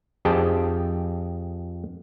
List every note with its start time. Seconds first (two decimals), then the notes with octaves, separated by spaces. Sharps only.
0.25 F2 G4 G#4 G5 A5